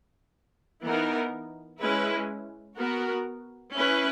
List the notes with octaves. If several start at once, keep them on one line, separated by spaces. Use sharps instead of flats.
E3 B3 D#4 A#4
G#3 C#4 E4 B4
B3 F#4 A#4
C#4 E4 B4